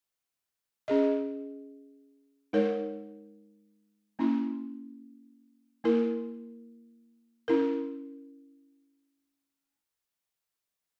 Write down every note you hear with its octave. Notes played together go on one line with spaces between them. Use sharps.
C#4 G#4 D#5
G#3 D#4 A#4 C#5
A#3 C#4 E4
A#3 E4 A#4
C#4 E4 A#4